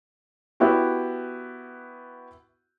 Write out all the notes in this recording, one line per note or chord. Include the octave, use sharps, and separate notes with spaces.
B3 E4 F#4 G4